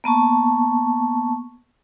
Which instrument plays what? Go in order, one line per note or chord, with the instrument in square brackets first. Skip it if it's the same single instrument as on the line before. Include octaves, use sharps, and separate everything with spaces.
[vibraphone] A#3 B3 A5 C#6